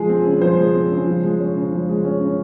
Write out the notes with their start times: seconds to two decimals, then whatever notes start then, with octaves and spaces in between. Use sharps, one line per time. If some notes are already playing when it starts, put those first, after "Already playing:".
Already playing: F3 G#3 G#4
0.09 C4
0.26 C#3
0.41 F3 C5
0.58 G#3
0.75 C4
0.91 C#3
1.07 F3
1.24 G#3
1.39 C#4
1.56 C#3
1.73 F3
1.89 G#3
2.04 C#4
2.20 C#3